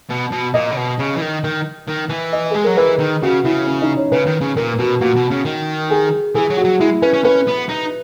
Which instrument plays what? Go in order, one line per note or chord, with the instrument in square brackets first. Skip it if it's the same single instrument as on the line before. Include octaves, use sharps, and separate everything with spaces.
[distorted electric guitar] B2
B2
[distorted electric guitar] A#2 [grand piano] D#5
[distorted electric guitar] C#3
B2
C#3
E3
D#3
D#3
D#3
E3
[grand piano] D#5
[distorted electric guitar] G#3 [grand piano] G#4
[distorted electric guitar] F#3 [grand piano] A#4
[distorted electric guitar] E3 [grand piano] B4
[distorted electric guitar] D#3
[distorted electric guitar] C#3 [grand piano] F#4
[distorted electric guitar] C#3 [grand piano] E4
[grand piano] C#4
D#4
C#5
[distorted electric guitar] C#3 [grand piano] B4
[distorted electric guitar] D#3
C#3
[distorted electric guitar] A#2 [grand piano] A#4
[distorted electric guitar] B2 [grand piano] F#4
[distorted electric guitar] A#2 [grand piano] F#4
[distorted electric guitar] B2
C#3
D#3
[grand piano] G#4
[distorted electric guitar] E3 [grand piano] G#4
[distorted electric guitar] F#3
[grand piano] F#4
[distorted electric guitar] F#3
[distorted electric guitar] G#3 [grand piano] E4
[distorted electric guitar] C#4 [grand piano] B4
[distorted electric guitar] C#4
[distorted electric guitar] C#4 [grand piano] B4
[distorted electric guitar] B3
D#4